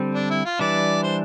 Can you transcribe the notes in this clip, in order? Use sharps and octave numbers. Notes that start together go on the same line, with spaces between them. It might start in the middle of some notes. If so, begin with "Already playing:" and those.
Already playing: D3 G3 C4
D4
E4
F4
E3 G3 D4 D5
C5